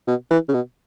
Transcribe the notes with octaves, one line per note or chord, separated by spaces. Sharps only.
B2
E3
C#3
B2